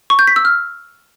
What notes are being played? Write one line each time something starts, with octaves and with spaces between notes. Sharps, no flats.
C#6
G6
B6
E6
F6